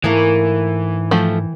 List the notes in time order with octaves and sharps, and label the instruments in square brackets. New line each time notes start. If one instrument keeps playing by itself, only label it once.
[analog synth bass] G#2 [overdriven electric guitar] E3 [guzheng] A3 A#3 G#4
[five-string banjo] F3 A3 [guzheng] G5